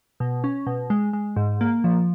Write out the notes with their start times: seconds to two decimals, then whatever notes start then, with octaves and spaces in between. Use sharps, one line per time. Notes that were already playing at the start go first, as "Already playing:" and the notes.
0.20 B2
0.44 C#4
0.67 B2
0.90 G#3
1.13 G#3
1.36 G#2
1.61 A#3
1.84 F3